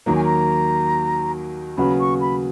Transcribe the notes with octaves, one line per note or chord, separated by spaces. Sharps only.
D#2 D#3 F#3 A#3 A#5
G#5
A#5
D#2 C#3 F#3 B3 F#4 B5
C#6
B5